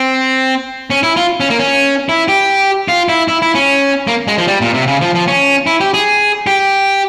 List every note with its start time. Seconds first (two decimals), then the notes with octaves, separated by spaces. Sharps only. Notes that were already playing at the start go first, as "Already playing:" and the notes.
Already playing: C4
0.90 C#4
1.03 E4
1.17 F4
1.40 C#4
1.50 A#3
1.59 C#4
2.09 E4
2.28 G4
2.88 F4
3.09 E4
3.28 E4
3.42 E4
3.55 C#4
4.07 A#3
4.28 G#3
4.38 F3
4.47 G3
4.61 A#2
4.74 C3
4.87 C#3
5.01 F3
5.15 F3
5.27 C#4
5.67 E4
5.80 G4
5.94 G#4
6.47 G4